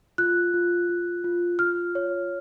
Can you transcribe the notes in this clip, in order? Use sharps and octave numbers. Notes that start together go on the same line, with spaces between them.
F4 F#6
F4
F4
F4
F4 F6
C#5